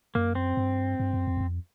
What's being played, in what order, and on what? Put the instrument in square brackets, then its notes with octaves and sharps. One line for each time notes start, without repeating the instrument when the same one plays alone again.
[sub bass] F#2 [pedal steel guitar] A#3
[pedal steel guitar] C4
[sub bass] G2
G2
F#2
F2
E2
F2